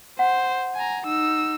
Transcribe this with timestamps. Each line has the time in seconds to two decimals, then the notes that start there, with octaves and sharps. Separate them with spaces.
0.19 C5 F#5
0.75 G#5 A#5
1.06 D#4 E6